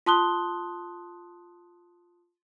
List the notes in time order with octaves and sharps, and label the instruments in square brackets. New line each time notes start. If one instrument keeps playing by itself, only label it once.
[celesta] F4 A5 C6 D#6 F#6 G7